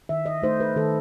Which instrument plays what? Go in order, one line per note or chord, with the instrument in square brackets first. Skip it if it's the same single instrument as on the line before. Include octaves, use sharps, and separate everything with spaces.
[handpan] D#3 E5
D#5
A3 D#4 C5
B4
D#3 A4